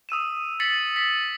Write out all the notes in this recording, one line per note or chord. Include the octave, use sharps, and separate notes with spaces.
D#6 E6 D#7 E7
A6 B6 C#7 F#7
B6